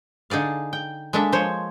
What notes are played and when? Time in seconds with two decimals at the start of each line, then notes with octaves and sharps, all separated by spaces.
0.30 D3 D#4 G#4 D5 F5
0.73 G5
1.13 G#3 A#3 D4 A4 E5
1.32 F3 C5 C#5